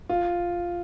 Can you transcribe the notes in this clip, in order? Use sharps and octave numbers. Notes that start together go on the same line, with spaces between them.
F4